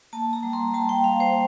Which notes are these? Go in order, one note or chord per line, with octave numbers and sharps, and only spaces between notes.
A#3 A5
A#5
G3
C6
G3 A5
G5
G3 F5
C5